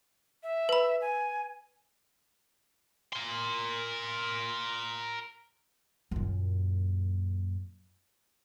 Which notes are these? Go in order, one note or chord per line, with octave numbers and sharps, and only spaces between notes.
E5
B4 B5
G#5
A#4 C6
F#2 A#2